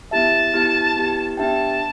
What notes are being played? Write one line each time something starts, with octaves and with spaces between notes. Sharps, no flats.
B3 E4 G4 E5 A5
B3 E4 G4
B3 E4 G4
B3 D4 G4 E5 G5 A5